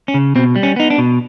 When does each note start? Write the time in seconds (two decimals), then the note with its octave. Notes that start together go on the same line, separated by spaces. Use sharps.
0.08 C#4
0.14 C#3
0.35 B2 C4
0.56 G3
0.63 C#4
0.76 B3 D#4
0.90 D4
0.98 B2